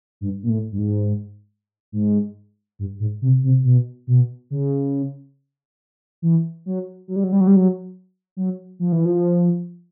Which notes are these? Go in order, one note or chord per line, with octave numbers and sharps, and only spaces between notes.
G2
A#2
A2
G2
G#2
G#2
G2
G#2
C3
C3
B2
B2
C#3
E3
F#3
F#3
G3
F#3
G3
F#3
G3
F#3
F#3
F3
E3
F3